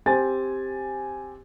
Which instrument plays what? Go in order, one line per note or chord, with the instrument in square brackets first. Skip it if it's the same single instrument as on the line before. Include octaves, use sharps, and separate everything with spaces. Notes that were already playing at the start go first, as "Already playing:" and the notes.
[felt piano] C4 G4 C5 G#5 A6